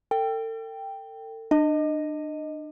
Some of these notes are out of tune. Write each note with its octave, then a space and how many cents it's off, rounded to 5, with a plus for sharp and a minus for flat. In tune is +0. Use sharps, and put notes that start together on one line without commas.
A4 +40 G5 +0
D4 +35 D#5 +0